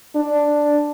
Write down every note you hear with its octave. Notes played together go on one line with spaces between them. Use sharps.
D4